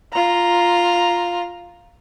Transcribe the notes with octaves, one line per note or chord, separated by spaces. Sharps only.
F4 A#5